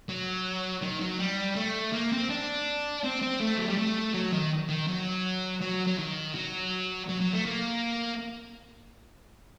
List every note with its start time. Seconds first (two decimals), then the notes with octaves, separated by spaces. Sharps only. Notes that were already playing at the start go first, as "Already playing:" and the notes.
0.09 F#3
0.83 D#3
1.01 F#3
1.20 G3
1.56 A3
1.93 A#3
2.12 C4
2.30 D4
3.04 C4
3.22 C4
3.40 A3
3.57 F#3
3.67 G3
3.78 A3
4.14 F#3
4.33 D#3
4.69 D#3
4.88 F#3
5.62 F#3
5.87 F#3
5.99 D#3
6.35 F#3
7.09 F#3
7.21 F#3
7.33 A3
7.45 A#3